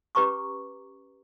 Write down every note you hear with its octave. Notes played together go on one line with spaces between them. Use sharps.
C#4 G4 B4 A#5 C#6 D6